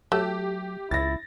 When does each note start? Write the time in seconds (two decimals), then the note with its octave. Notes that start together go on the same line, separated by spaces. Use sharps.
0.12 F#3 A3 G4
0.91 C#2 E4 A6 A#6